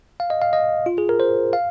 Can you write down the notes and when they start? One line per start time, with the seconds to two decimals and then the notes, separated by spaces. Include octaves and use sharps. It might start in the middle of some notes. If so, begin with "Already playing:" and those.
0.20 F5
0.30 D#5
0.42 F5
0.53 D#5
0.86 F4
0.98 G#4
1.09 A#4
1.20 C5
1.53 F5